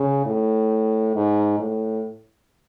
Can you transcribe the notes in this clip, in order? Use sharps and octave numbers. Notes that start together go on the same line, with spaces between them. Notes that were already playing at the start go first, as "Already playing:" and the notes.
Already playing: C#3
A2
G#2
A2